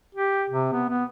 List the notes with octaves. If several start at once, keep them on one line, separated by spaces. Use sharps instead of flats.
G4
C3
B3
B3